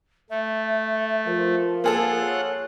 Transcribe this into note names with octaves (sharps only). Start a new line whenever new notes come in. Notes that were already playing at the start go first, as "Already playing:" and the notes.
A3 E5
F3 A#4
A#3 F4 G#4 A4 F#5 F#6
C#5